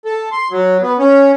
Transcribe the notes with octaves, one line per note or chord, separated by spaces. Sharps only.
A4
C6
F#3
B3
C#4